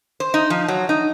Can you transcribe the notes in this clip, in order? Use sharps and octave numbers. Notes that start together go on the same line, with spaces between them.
C5
D#4
F3
F#3
D#4